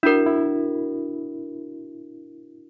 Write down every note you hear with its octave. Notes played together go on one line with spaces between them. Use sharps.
D4 E4 F#4 A#4
E4